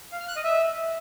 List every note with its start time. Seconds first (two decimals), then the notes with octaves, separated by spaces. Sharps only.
0.12 F5
0.20 F6
0.28 F#6
0.36 D#5
0.44 E5